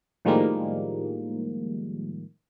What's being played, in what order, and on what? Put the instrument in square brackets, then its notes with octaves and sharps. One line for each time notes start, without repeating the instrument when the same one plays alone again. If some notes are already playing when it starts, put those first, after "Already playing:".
[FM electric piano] A2 D#3 F3 G3 G#3 A#3